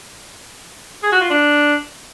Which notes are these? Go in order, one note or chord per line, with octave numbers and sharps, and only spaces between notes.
G#4
F#4
F4
D4